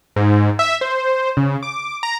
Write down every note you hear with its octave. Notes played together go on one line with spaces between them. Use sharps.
G#2
E5
C5
C#3
D6
A#5